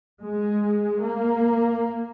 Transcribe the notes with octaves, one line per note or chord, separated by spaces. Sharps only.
G#3
A#3